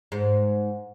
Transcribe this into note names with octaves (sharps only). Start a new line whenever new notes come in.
G#2